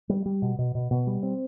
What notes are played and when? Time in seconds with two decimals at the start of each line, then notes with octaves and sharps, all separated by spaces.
0.09 G3
0.26 G3
0.42 B2
0.58 B2
0.75 B2
0.91 B2
1.07 G3
1.23 C4